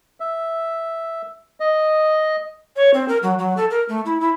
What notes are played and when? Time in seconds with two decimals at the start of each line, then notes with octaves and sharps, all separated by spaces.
0.20 E5
1.60 D#5
2.76 C#5
2.94 C4
3.08 A#4
3.23 F#3
3.39 F#3
3.57 A4
3.71 A#4
3.89 A3
4.06 E4
4.20 E4